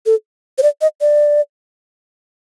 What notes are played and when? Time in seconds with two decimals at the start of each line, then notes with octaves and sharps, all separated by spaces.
0.06 A4
0.58 C5
0.63 D5
0.81 D#5
1.01 D5